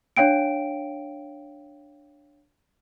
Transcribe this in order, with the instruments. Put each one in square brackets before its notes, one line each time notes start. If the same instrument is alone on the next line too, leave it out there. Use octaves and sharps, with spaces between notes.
[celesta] D4 C#5 F5 G5 D7